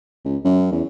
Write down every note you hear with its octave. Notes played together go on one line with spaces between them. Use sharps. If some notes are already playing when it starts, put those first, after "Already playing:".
C#2
F#2
E2